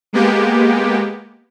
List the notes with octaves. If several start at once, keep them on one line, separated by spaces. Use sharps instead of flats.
G#3 A#3 B3 G4